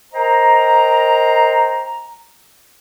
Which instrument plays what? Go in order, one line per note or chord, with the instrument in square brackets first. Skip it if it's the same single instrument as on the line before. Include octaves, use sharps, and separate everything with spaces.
[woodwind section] A#4 C5 D#5 G5 A#5